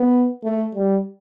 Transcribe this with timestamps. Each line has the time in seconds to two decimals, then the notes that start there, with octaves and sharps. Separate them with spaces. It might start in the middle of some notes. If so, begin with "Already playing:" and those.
Already playing: B3
0.43 A3
0.75 G3